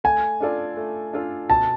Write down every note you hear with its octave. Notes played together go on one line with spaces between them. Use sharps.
A3 G#5
D4 F4 A4 D5
A3
D4 F4 A4 D5
B2 A5